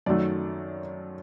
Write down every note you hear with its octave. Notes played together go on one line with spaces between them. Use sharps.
F#2 D#3 F#3 A3 D5